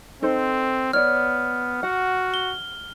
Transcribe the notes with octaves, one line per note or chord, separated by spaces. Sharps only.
C4 D#4 A4 C5
B3 C#5 D5 F6
F#4 F#5
G7